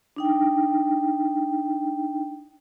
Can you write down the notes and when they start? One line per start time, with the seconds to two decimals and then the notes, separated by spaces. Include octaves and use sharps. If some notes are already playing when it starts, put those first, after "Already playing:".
0.16 D4 D#4 G5